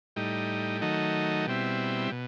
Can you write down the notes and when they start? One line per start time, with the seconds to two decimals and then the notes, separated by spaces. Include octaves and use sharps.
0.16 A2 G3 D#4
0.81 D#3 F#3 A3 D#4
1.46 B2 G3 C4 E4
2.12 B2